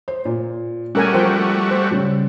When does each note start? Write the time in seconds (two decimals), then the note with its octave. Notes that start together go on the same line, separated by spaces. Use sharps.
0.08 C5
0.25 A#2
0.95 G3 A3 C#4 F#4 A#4 G#5
1.14 F3 A#4 C5 G5
1.71 C5
1.91 C#3 G3